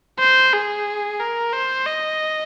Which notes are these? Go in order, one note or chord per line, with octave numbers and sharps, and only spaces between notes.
C5
G#4
A#4
C5
D#5